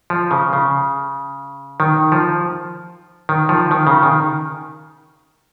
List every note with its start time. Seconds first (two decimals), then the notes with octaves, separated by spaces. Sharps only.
0.10 F3
0.31 C#3
0.53 C#3
1.80 D#3
2.12 F3
3.29 D#3
3.49 F3
3.71 D#3
3.87 C#3
4.03 D#3